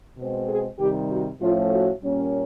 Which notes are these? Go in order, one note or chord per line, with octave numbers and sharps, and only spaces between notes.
B2 G#3 C4
G#4
C3 D#3 G3 G4
F#4
A2 F3 A3 C#4 F4
F#4
A#2 G3 A#3 C#4